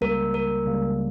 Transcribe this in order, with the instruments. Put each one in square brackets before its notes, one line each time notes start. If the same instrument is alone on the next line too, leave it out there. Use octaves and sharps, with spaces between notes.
[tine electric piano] C#2 C#3 G3 A#3 [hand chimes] A#4
[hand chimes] A#4
[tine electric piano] C#2 C#3 G3 A#3